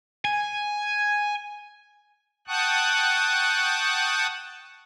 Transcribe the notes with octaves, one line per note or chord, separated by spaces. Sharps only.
G#5
F#5 G5 A5 C#6 D#6 F#6